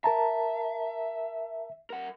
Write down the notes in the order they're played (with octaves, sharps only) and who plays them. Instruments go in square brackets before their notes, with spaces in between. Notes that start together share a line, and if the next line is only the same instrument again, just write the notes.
[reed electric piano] A#4 A5 A#5 [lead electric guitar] E5
[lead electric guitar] A#4 F#5